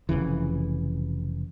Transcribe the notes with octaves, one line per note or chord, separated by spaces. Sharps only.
F1 A#1 C#3 E3